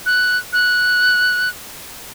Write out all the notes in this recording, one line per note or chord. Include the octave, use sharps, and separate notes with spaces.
F#6
F#6